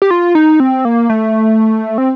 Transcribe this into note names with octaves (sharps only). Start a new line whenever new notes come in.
G4
F4
D#4
C4
A#3
A3
C4